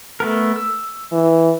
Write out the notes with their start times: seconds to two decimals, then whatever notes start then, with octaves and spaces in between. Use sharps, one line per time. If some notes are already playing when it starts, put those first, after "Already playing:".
0.20 A3 B3 A#4
0.56 E6
1.12 E3